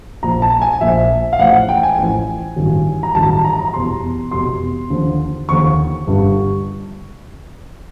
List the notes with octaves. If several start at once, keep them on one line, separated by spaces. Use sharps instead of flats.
A#1 A#2 F3 A#5
A5
G#5
A#1 A#2 F3 E5
F5
A1 A2 F3 F#5
G5
G#5
A1 A2 F3
A1 G2 D#3 F#3
A#5
A1 G2 D#3 F#3 A5
A5
A#5
A#5
F1 E2 B2 G3 C6
F1 E2 B2 G3 C6
D#2 D3 F3
D#2 D3 F3 C#6
G1 G2 D3 G3